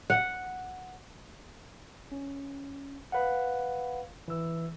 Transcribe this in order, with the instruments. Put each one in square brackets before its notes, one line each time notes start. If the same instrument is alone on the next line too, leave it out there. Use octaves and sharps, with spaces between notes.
[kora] F#5
[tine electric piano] C#4
B4 F5 F#5
E3 E6